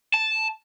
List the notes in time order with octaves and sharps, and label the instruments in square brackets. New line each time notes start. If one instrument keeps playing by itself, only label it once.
[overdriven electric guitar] A5